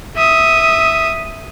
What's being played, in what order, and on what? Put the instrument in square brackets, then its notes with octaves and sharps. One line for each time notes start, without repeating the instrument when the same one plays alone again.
[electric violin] E5 D#6